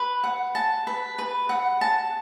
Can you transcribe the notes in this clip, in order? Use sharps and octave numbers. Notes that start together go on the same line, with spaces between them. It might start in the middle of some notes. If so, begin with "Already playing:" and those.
Already playing: B4
F#5
A5
B4
B4
F#5
A5